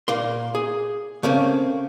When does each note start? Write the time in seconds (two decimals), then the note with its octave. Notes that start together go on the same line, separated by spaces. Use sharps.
0.08 A#2 A#3 C6
0.55 G#4
1.23 C#3 A3 A#3 C4 C#4